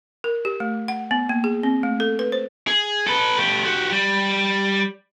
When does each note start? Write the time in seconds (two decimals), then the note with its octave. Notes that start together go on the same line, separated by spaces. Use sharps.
0.24 A#4
0.45 G4
0.60 A3
0.88 F#5
1.11 B3
1.29 A#3
1.44 G#4
1.63 C4
1.83 A3
2.00 A4
2.19 B4
2.32 C5
2.67 G#4
3.07 A4 B4
3.38 A3 G4
3.65 F#4 G4
3.92 G3